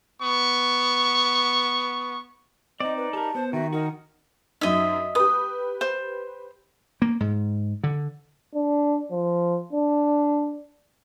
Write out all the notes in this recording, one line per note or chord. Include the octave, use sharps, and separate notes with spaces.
B3 C#6
C4 D#4 D5 D#5
B4
G4 A4 A#4 A5
B3 C5
D#3 F#4 E5
D#4 F#4 A#4
F#2 D#4 D#5 E5
G4 B4 D#6
C5
A#3
G#2
D3
D4
F3
D4